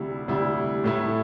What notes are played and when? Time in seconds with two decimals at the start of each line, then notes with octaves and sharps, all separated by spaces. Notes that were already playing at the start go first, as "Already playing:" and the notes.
Already playing: D2 C3 G3 E4
0.28 D2 C3 G3 E4
0.84 A2 A3 E4